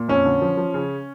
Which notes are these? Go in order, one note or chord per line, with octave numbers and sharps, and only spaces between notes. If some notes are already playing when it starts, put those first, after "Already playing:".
Already playing: A#2
F2 C#4
D3
F3
F3
C#3